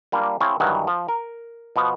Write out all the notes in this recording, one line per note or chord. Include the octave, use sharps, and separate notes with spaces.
G3 A#3 D4 F4
C4 E4 G#4 C#5 F5 A5
G2 D#3 E3 F#3 F#5
F3
A#4
B2 F3 B3